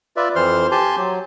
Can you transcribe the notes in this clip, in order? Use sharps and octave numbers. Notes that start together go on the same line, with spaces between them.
F4 B4 D5 E5
F2 E3 C5 C6 F6
G4 G#5 A5 C6 G6
F#3